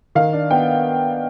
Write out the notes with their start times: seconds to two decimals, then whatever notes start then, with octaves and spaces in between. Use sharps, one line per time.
0.15 D#3 F5
0.33 D4
0.51 B3 G5